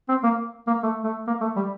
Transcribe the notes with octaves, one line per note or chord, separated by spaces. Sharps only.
C4
A#3
A#3
A3
A3
A#3
A3
G3